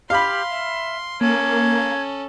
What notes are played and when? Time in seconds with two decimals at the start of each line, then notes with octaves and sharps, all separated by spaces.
0.10 G4 F5 B5 C6
0.50 E5
1.21 A#3 C#4 A4 G#6